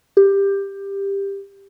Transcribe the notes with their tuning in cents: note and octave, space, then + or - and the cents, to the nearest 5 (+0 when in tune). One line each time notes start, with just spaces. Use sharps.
G4 +15